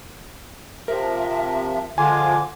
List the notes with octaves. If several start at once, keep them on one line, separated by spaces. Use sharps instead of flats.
C3 F3 A#4 E5
D3 F3 G#3 F4 G#5 C6 D6